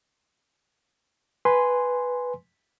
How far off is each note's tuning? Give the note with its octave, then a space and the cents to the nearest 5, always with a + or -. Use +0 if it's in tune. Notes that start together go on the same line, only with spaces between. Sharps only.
B4 +0 G#5 +0 C6 -10